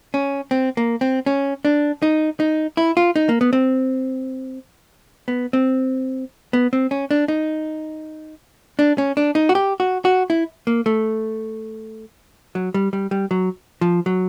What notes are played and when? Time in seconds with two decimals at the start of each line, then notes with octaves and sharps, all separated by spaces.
0.14 C#4
0.51 C4
0.77 A#3
1.01 C4
1.26 C#4
1.65 D4
2.02 D#4
2.40 D#4
2.77 E4
2.97 F4
3.16 D#4
3.29 A#3
3.41 B3
3.53 C4
5.28 B3
5.53 C4
6.53 B3
6.73 C4
6.91 C#4
7.11 D4
7.28 D#4
8.79 D4
8.98 C#4
9.17 D4
9.35 D#4
9.49 F#4
9.55 G4
9.80 F#4
10.05 F#4
10.30 E4
10.67 A#3
10.86 A3
12.55 F#3
12.74 G3
12.93 G3
13.11 G3
13.31 F#3
13.81 F3
14.06 F#3